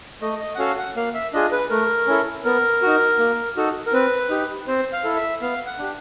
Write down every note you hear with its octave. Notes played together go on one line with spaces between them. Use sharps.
A3 D#5
D#5
F#5
C#4 F#4 A4 F5
F#5
A#3 F5
E5
D4 F4 G#4 D#5
B4
A3 A#4
C#4 E4 A4
B3 A#4
D#4 F#4
A#3
D#4 F#4 A4
A#4
C4 B4
D#4 G4
C4 C5
F5
E4 A4
E5
B3 F5
F#5
D4 G4